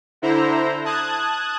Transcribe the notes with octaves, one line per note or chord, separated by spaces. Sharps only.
D3 E4 C5 A#5
A5 D#6 F#6 G#6